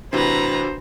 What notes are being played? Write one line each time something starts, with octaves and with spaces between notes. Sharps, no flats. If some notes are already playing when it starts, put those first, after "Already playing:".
A2 C3 E3 D4 F#4 B4 C5 A#5